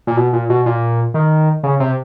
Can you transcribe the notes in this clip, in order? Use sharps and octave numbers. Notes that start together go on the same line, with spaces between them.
A#2
B2
A#2
B2
A#2
D#3
C#3
C3